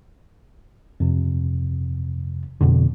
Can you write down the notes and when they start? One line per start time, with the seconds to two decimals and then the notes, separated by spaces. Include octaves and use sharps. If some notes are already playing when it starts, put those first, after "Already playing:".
1.00 F2 C3
2.61 F2 B2 D3